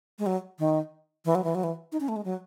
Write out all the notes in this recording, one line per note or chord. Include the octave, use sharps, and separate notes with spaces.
G#3
F#3
D#3
E3
F#3
E3
F#3
E3
D#4
C#4
A3
G#3
F#3